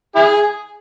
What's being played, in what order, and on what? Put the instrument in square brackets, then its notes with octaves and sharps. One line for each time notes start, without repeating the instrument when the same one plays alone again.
[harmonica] E4 G#4